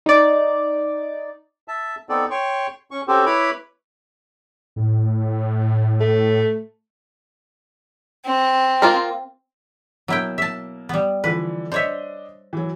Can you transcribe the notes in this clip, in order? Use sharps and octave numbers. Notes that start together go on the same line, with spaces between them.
D#4 D5
E5 A5
B3 C4 D#4 A4 D5
C#5 G5 C6 C#6
C#4 C#6
C4 C#4 F#4 G4 A4 C5
E4 B4 C#5 B5 D6
A2
A3
C4
A#3 F4 A#4
B2 F#3 A#3 E4 G5
E5 A5
G3 B3
D3 E3 F3 B4
D4 C5 C#5 D#5 E5
E3 F#3